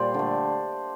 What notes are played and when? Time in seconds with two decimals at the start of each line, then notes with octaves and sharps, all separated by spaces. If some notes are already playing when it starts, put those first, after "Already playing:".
Already playing: A#2 G3 C5 D5
0.14 D3 A3